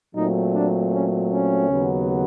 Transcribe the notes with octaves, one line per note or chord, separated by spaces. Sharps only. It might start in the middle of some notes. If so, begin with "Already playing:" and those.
A#2 F#3 A3 C4 D#4
D4
C#4
C#4
D#2 C#3 F#3 B3